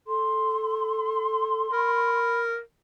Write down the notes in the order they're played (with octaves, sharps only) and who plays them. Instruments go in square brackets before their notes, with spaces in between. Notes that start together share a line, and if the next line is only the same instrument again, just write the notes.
[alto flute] A4 [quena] C6
[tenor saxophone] A#4 [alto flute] B5